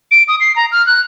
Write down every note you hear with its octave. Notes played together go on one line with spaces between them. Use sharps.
D7
D#6
C7
A#5
F6
F#6